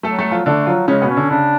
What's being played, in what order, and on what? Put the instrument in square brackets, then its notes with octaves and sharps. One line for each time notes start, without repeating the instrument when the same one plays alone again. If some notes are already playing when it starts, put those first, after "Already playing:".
[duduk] F#3 [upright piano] A3 A4
[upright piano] A3 A4
F3 F4
[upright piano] D3 D4 [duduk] A3
[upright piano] F3 F4 [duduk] F#3
[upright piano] C#3 C#4 [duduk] G#3
[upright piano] B2 B3
[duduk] C#4
[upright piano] D3
[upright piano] C#3 [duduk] D4